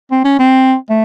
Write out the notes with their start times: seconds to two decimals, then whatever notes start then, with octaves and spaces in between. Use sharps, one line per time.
0.11 C4
0.25 C#4
0.39 C4
0.90 A3